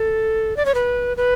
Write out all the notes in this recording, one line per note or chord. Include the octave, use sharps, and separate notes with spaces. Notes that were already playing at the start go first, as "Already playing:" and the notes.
Already playing: A4
D5
C#5
B4
B4